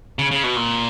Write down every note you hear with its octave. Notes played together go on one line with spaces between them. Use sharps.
C#3
C#3
B2
A#2